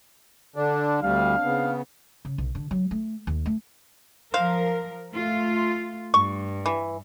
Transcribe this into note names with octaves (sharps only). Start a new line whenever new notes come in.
D3 D4
D2 G3 C4 D4 F5
C#3 B3
C#3
B1
D3
F#3
A3
D#2
A3
F3 A#4 C5 F5
A3 F4
G2 C#6
E3